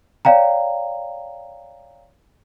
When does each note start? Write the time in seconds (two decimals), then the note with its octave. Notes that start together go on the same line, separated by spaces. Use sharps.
0.25 C#5 D5 F5 G5 A#5